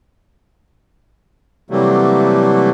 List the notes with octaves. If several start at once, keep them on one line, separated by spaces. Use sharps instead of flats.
C3 E3 F#3 G3 A3 A#3